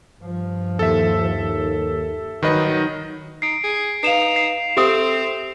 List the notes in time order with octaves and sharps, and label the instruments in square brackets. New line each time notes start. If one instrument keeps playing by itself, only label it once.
[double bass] G2 F3
[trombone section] D#2 [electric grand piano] A4 E5
[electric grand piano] D#3 B4 D#5 [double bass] F#3 D#4
[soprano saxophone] D#4 [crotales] C7 D7
[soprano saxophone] G#4
[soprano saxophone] D#4 [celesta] B4 F5 [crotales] C7 E7 F7
[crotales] C7
[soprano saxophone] C4 [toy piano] G4 D#6 [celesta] A4 E5